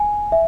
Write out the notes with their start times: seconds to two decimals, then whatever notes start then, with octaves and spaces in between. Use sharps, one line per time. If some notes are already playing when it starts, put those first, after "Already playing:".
Already playing: G#5
0.32 E5